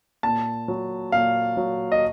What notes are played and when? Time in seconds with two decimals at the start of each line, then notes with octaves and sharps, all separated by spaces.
0.23 A#2 A5
0.68 F#3
1.12 A#2 F5
1.57 F#3
1.92 D#5